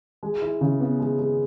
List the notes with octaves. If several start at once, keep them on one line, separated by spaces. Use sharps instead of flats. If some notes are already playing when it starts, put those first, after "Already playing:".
G#3
E4
C#3
B3
G#3
G#3